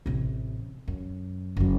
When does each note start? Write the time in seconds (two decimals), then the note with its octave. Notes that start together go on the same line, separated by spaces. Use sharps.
0.06 A1 C3
0.88 F#2
1.57 F#1 F#3